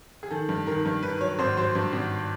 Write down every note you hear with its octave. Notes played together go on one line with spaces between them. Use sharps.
G#4
D#3 A4
G2
D#3 A#4
G2
D#3 B4
F#3 C#5
G#1 C5
F#3 C5
G2
G#1